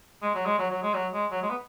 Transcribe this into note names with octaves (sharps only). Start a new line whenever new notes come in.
G#3
F#3
G#3
F#3
F#3
G#3
F#3
G#3
F#3
G#3
B3